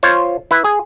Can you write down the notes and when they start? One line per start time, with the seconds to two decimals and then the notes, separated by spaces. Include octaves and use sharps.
0.03 F4 C5 C#5
0.51 E4 B4
0.64 G#4